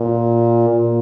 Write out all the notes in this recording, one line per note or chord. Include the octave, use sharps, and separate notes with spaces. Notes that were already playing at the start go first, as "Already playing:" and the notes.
Already playing: A#2
A#2